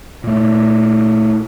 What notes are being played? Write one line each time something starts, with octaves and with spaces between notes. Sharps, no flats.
A#2 A3